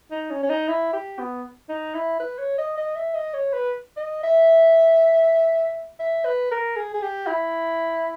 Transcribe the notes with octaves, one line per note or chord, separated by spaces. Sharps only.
D#4
C#4
C#4
D#4
E4
G4
B3
D#4
E4
B4
C#5
D#5
D#5
E5
D#5
C#5
B4
D#5
E5
E5
B4
A#4
G#4
G#4
G4
E4